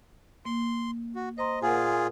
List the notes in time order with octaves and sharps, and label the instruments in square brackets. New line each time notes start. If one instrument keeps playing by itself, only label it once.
[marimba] A#3 [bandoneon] C6
[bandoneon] F#4
[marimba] C5 A#5 C6 [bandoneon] D#5
[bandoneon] A#2 F4 G#4 [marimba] A#4 F#5 G#5